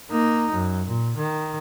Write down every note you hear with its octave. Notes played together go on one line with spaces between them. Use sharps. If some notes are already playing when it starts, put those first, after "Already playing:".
A#3 D#4
F#2
A#2
D#3